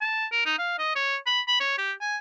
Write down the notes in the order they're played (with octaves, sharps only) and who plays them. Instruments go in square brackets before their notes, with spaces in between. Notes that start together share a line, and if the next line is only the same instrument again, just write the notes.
[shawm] A5
A#4
D#4
F5
D#5
C#5
B5
B5
C#5
G4
G#5